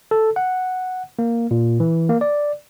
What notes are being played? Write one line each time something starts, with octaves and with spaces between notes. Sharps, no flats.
A4
F#5
A#3
A#2
E3
A#3
D5